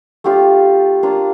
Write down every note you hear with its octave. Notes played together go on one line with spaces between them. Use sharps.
A3 D4 F4 G4
A#3 D4 F4